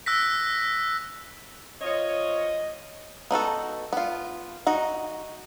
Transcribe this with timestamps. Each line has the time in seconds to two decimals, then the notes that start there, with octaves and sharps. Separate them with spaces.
0.06 E6 F#6 A#6 B6
1.82 F4 C5 C#5 D#5
3.31 B3 D#4 F#4 A4
3.93 B3 F4
4.67 D#4 F#4